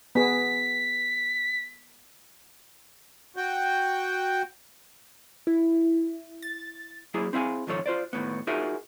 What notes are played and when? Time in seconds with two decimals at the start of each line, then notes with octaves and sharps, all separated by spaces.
0.15 B3 G#4 B6
3.36 F#4 G5
5.47 E4
6.42 A6
7.14 F#3 A#3 E4 G#4
7.33 C4 E4 G#4 F5 G#5
7.67 C#2 G#2 D#3 F3 A4 C#5
7.86 F4 C5 D5
8.13 D#2 A2 B3
8.47 D#4 F4 F#4 G#4 A#4 E5